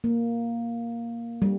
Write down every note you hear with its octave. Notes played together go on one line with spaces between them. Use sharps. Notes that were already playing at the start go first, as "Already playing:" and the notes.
A#3
G3